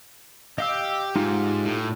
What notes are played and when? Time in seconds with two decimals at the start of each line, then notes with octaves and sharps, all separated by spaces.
0.58 G4 D#5 F5 E6
1.16 G#2 D#4 F4 G4
1.65 A2